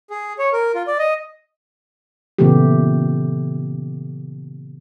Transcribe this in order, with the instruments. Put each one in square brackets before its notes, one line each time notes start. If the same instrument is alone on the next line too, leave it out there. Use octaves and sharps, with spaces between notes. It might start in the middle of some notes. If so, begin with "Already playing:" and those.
[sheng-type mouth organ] G#4
C#5
A#4
F4
D5
D#5
[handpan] A#2 C#3 E3 A3 B3 G4